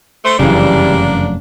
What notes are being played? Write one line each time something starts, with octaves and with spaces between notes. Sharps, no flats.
A3 C5
F1 F#2 C#3 E3 G3 A#3 D4